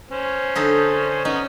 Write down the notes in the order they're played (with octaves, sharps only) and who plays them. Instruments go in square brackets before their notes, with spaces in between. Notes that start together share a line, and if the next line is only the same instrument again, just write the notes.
[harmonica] C#4 C5
[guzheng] D3 D#4 A4
[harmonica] B3 D#4 [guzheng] C#4